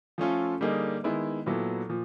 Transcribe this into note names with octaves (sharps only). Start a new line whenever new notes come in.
F3 A3 C#4 F4 A4
D3 G3 A#3 D#4 G#4
D#3 G#3 B3 E4
A#2 F#3 B3 E4 A4
A#2 F3